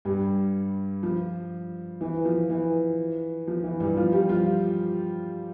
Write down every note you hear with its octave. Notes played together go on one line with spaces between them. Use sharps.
G2 G3
F3
E3
F3
E3
F3
E3
G2 G3
F3 F4
G3 G4
F3 F4